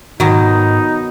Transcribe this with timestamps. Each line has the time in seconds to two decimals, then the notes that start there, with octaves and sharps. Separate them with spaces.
0.20 G#2 B2 D#3 F#3 D#4